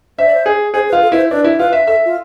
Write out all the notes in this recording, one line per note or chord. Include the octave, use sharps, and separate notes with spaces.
C5 E5
D5
C5
G#4
G#4 C5
B4
F4
A4
E4 B4
C5
D4 B4
E4
F4 B4
E5
A4 E5
F4